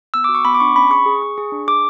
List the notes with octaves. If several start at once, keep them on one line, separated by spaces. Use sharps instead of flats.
B3 E6
D6
F#4
C#6
B3 B5
D6
D4 C#6
C#4 B5
G#4 C#6
G#4
G#4
G#4
D4
G#4 D6